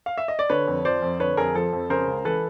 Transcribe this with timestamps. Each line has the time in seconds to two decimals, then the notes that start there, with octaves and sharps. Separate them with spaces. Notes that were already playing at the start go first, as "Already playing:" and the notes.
0.06 F5
0.18 E5
0.28 D#5
0.39 D5
0.50 D3 B4 C#5
0.68 F2
0.85 F3 C5 D5
1.02 F2
1.20 D3 B4 C#5
1.37 F2 G#4 A#4
1.55 F3 A4
1.73 F2
1.90 C#3 A#4 C5
2.07 C#2
2.25 E3 A4 B4